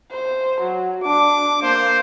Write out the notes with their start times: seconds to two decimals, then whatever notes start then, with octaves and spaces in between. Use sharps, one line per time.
0.11 C5
0.61 F#3
1.04 D4 D6
1.62 A#3 C5